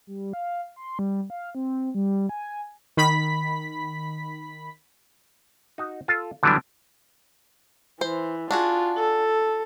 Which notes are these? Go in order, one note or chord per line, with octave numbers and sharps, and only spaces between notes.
G3
F5
C6
G3
F5
C4
G3
G#5
D#3 B5 B6
D#4 F#4
F4 A4
D3 E3 F#3 G3 B3 D4
E3 C5
D4 F4 F#4 G#4
A4